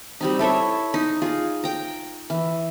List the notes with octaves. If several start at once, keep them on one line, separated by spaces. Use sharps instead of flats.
G3 C4 D#4
E4 A4 C#5 E5
D#4
F4 G#4
G5 A#5
E3